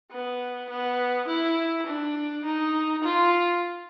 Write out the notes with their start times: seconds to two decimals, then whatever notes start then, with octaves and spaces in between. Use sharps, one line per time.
0.12 B3
0.69 B3
1.28 E4
1.87 D4
2.44 D#4
3.03 F4